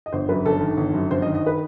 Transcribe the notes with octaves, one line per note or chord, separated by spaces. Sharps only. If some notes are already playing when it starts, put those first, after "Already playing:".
D#5
G1 C5
F#2 B4
G1 A4
D#3
G1
F#2
G1 C5
D#5
D#3
D#5
B4